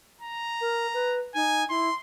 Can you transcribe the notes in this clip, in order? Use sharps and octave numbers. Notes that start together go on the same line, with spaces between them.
A#5
A#4
B4
D#4 G#5
E4 C6